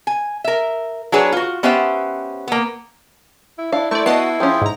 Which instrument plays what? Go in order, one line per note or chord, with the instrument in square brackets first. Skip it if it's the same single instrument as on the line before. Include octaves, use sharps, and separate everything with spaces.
[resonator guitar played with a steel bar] G#5
A#4 E5
F#3 D4 G#4 B4 C#5
F4 F#4
B3 C#4 G4 C5 E5 F#5
A#3 B3
[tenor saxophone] E4
[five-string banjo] D4 F5 [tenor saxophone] E4
[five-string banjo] A3 [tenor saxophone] E4 [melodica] C5 [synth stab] D5 C#6
[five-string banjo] B3 [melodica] F#4 [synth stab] D#5 A5 C7
[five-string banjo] F3 C#4 [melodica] F4 G#4 G5
[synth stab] G#2 A#5